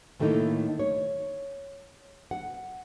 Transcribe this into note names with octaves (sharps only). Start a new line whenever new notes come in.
A2 D#3 A3 A#3 D#4 E4
C#5
F#5